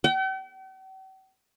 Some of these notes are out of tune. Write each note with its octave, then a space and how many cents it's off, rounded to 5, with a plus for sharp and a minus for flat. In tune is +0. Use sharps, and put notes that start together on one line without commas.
G5 -45